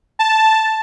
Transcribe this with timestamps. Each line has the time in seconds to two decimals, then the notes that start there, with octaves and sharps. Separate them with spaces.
0.19 A5